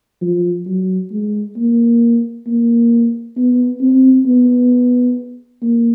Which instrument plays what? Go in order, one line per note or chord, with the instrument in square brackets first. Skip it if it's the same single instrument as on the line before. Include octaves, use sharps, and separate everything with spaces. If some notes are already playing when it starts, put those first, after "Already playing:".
[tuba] F3
F#3
G#3
A#3
A#3
B3
C4
B3
A#3